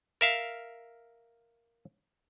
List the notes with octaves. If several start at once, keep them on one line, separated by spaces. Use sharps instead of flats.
A#4 E5 F5